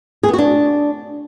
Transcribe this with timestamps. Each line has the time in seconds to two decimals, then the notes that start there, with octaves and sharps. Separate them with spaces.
0.23 G#4
0.28 B3
0.33 F#4
0.38 D4